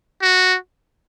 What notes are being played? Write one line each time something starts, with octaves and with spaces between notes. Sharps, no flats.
F#4